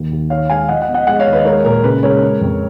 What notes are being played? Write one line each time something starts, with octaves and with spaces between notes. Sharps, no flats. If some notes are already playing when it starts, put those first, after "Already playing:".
Already playing: D#2 A#3
D#2
D#3 C#5 F5
G#3 F5 G#5
F3 D#5 F#5
D#5 F#5
B3
D#5 F#5
G#3 D#5 F#5
C#5 F5
D#2
B4 D#5
G#3 A#4 C#5
A#2 A#4
C#3 B4
G#3 A#4 C#5
G#3
F2